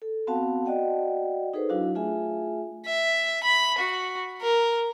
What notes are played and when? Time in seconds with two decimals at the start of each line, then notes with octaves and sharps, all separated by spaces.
0.02 A4
0.27 B3 C4 F#4 F5 F#5 A5
0.65 F#4 D5 D#5 F#5 G5
1.54 D#4 G#4 A4 B4 C5
1.69 F#3 D4 E4 F#4 F5
1.95 A3 F4 G#4 E5 G#5
2.86 E5
3.43 B5
3.79 F#4
4.42 A#4